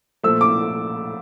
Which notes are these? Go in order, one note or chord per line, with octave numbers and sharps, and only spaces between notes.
A#2 F3 A3 E6
D6